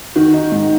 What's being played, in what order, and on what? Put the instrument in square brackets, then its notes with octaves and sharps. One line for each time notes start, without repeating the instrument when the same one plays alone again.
[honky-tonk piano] D#3 [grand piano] F#4
[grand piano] D#4
G#2